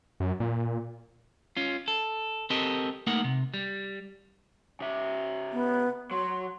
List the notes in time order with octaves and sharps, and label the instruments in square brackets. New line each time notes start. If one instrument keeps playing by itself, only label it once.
[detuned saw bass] F#2
A#2
[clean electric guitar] C#4 F4
A4
C4 G4 A4 A#4 D#5
A3 A#3 D#4 A#4 F#5
C3
G3
[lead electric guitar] C#3 E5
[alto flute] B3
[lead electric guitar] F#3 [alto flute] C6